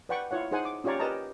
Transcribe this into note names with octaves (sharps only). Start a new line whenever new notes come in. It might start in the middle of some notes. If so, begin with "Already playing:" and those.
B4 D5 F#5 G5 C#6
E4 F4 C#5 F#5
D#4 G#4 C5 F#5 G#5
D6
C#4 F4 G4 C#5 D5 A#5
G4 A#4 B4 D#5 A5 A#5